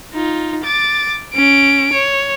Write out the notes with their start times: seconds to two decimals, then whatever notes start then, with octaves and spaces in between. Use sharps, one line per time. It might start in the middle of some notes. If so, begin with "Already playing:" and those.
0.13 D#4 F4
0.64 D6 A6
1.34 C#4 D7
1.93 C#5